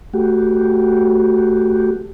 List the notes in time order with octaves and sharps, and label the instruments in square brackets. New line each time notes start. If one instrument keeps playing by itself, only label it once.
[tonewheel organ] A3 F#4 G4